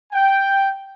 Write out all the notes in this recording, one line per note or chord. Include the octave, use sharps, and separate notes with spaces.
G5